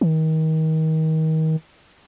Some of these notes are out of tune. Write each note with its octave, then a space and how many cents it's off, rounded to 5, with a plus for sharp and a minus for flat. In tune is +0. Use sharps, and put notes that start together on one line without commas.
D#3 +30